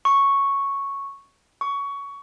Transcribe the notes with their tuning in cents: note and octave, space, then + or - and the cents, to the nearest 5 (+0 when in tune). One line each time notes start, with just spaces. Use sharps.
C#6 -5
C#6 +20